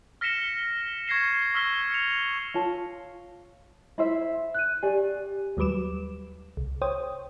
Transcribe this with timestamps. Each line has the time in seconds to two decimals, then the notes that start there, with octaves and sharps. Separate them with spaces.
0.21 F6 A#6 B6 C#7 E7 G7
1.08 C#6 G#6 A#6 C7 E7
1.54 C#6 E6 F6 B6 G7
1.92 C#7 F7
2.54 F4 C#5 A5
3.98 E4 C5 E5
4.55 F#6 D#7
4.83 G4 D5 G#5
5.57 D#2 F#3 G3 B4 D6 E7
6.57 C2
6.82 C5 C#5 G5 D#6